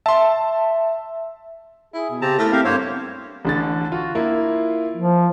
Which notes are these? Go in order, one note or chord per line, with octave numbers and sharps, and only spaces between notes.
E5 A5 C6
E4 G#4
B2
C#3 C4 G4 A5 A#5
A3 E4 A#4 A#6
C4 G4 A#4 F5
G2 A#3 B3 C5 C#5 E6
A1 D3 A6
F4 F#4
A#3 E4 F4
F3